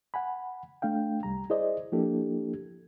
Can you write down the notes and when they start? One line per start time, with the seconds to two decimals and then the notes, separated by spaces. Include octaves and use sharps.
0.14 F#5 G#5 B5
0.82 A3 D4 F5 G5
1.23 C2 G3 A#5
1.50 E4 G#4 C5 D5 D#5
1.92 F3 A#3 D4 E4 G4 A4